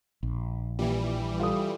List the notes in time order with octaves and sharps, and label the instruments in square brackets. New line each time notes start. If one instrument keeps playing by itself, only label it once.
[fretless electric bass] A#1
[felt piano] A#2 [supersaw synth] E3 G3
[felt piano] F4 A4 D#6